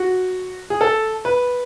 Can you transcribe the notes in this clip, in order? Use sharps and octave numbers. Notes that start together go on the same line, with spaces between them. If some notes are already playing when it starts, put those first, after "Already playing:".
Already playing: F#4
G#4
A4
B4